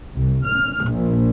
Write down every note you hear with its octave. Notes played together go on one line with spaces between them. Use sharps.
C2
F6
A#1